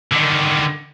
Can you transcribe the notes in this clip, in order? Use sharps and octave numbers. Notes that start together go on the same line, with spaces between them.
D3 D#3